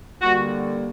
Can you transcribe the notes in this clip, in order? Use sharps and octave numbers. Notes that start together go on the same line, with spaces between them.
D3 G3 A#3 F#4